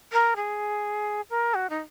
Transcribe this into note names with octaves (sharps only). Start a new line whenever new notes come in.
A#4
G#4
A#4
F#4
D#4